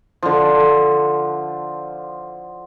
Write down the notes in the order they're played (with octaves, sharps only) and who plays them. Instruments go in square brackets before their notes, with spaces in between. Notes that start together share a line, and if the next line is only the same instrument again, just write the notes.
[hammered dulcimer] D3 F3